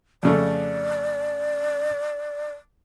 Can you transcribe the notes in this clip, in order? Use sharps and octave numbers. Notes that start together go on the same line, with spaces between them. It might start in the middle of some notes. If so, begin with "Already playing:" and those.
F2 C#3 A3 D5